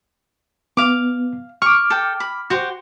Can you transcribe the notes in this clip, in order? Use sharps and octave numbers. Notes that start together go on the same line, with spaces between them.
B3 F5 D6
C#6 D6 F6
A4 G5
B5
F#4 G4 C5